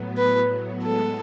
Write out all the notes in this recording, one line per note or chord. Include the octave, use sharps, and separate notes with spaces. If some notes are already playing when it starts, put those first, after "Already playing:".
Already playing: A2 F#3 B3
B4
A2 G#3 B3 A4